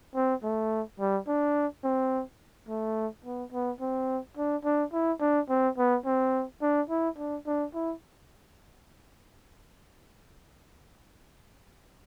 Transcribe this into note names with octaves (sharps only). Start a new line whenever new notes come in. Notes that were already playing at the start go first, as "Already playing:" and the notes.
C4
A3
G3
D4
C4
A3
B3
B3
C4
D4
D4
E4
D4
C4
B3
C4
D4
E4
D4
D4
E4